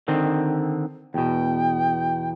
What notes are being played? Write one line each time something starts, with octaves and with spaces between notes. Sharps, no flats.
D3 D#3 C4
E2 B2 G5